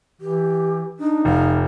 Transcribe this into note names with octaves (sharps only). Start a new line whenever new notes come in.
E3 G4
D4 D#4
F1 F5